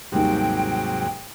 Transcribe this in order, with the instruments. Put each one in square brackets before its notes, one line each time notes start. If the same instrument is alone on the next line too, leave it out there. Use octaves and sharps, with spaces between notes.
[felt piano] D#2 G3 [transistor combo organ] G#2 C3 F#3 [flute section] G5